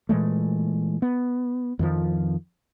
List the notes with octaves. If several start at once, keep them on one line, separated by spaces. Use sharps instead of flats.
A#2 E3 G#3 A3
B3
F2 D#3 F3